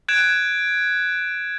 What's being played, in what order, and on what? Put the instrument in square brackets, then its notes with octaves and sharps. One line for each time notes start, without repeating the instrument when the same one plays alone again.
[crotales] F#6 G#6 D7 E7